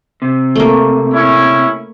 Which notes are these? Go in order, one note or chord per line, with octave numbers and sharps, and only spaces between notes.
C3
A3 A#3
C#4 E4